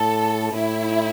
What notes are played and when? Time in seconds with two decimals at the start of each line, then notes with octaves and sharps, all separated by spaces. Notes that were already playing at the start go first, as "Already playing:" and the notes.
Already playing: A2 A4
0.53 A2 E4